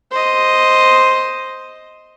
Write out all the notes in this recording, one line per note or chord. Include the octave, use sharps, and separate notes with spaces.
C5 D#5